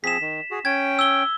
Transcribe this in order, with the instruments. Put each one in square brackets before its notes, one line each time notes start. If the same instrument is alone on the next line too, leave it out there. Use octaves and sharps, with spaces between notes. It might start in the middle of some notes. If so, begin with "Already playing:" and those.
[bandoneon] F3 C4 G#4 [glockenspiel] B6 E7
[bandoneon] D#3
F#4 G#4
[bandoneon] C#4 G5 [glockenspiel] G#6
[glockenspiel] E6 G7